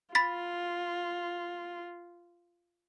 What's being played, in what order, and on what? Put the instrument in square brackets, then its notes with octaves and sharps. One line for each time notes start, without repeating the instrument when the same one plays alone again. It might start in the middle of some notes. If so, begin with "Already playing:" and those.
[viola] F4 [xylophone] B5 A6 B6